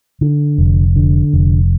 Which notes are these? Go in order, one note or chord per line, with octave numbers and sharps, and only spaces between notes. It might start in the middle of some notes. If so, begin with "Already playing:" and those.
D3
F1
D3
F1